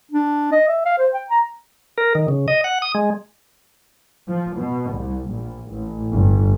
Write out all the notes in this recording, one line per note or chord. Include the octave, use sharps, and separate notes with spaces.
D4
D#5
E5
F5
C5
G5
A#5
A#4
D#3
C#3
D#5
F#5
D#6
G#3
F3
B2
C2
A#1
A1
G1